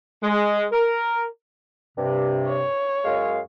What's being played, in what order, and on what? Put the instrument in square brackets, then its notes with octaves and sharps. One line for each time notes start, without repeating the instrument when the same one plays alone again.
[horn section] G#3
A#4
[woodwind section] G2 C3
[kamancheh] C#5
[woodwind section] F#2 G#3 F5